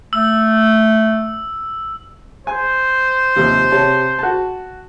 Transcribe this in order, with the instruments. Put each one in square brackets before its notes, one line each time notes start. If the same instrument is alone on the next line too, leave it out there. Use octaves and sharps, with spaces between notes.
[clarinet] A3 [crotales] E6
[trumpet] C5 [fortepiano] G#5
[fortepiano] D#2 C3 F3
C3 C#5 A5
F#4 A5